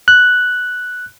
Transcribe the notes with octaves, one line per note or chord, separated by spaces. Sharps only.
F#6